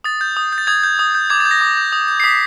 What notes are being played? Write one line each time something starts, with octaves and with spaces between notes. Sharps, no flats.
D#6 A6
G6
D#6
G6
A6
D#6 G#6
G6
D#6
G6
D6 G#6
A6
G6
A#6
D6
G6
D#6
G6
C7
D#6 B6